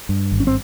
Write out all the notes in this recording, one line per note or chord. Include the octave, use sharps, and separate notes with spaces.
G2
G#1
C#4
C4